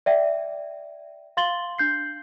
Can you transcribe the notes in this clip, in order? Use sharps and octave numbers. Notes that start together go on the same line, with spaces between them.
D5 E5 G5
F5 C6 A6 F#7 G7
D4 G6 C7